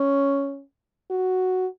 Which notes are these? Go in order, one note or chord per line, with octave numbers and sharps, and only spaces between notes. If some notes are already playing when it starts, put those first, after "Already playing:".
Already playing: C#4
F#4